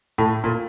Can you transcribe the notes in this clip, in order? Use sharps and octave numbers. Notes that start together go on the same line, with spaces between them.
A2
A#2